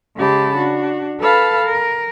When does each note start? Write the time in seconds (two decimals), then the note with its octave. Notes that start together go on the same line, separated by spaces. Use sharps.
0.17 C#3 G#3 G4 A5 B5
0.56 D4 F#4
1.19 A4 B4 F5 A5 B5
1.64 A#4